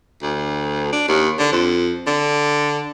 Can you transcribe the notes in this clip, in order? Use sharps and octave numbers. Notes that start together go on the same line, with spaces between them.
D2
D4
D#2
D3
F2
D3